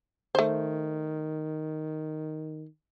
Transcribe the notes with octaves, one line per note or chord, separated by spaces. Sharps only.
D#3 A3 C5